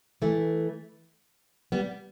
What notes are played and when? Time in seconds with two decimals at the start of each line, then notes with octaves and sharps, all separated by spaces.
0.22 E3 A3
1.72 G3 B3